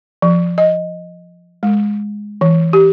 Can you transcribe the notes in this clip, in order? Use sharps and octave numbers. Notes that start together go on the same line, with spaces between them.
F3
D#5
G#3
E3
G4